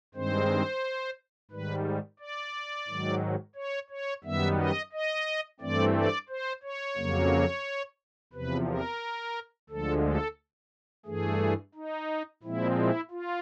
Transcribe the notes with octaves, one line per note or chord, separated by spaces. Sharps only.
G2 D#3 G#3 C4 C5
G#2 D#3 G3 B4
D5
G#2 D#3 F#3
C#5
C#5
F#2 D#3 G3 B3 E5
D#5
D#5
G2 E3 A3 C4 D5
D5
C5
C#5
F2 C#3 F#3 A#3
E2 C3 F3 B4
A#4
D2 D3 F3 G#3 A4
A4
G2 E3 A3 G#4
D#4
A#2 F3 G#3 C4 E4
E4
F4